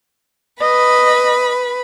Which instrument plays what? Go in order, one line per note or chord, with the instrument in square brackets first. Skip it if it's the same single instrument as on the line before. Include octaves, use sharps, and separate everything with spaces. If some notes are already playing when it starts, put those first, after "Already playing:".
[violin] B4 B5 [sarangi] D#5